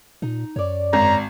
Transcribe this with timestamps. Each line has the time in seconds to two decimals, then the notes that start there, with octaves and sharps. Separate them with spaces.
0.22 A#2 D#4
0.56 F#2 C#5 D5
0.93 G#1 A#5